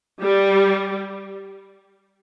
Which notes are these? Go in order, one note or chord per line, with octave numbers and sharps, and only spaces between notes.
G3